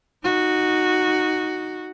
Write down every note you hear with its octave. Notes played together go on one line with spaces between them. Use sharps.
D#4 F#4